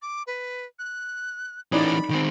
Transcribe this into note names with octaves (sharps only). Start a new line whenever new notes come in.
D6
B4
F#6
E3 C#4 D#4 D5 B5 D#6
D#3 C4